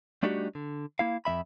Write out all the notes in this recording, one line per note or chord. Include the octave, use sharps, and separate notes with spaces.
G3 A3 D4 D#4 F#4 G4
D3
A#3 E4 F5
F2 G#3 E5 B5